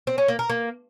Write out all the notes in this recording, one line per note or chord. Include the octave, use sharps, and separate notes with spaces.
C4
C#4
A#3
A#4
A#3